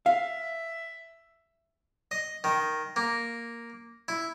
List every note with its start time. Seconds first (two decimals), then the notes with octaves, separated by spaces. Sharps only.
0.06 E5 F5
2.11 D#5
2.44 D#3
2.96 A#3
4.08 E4